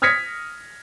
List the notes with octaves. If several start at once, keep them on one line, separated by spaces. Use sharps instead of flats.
D#6 F6 G#6 A#6 B6 C#7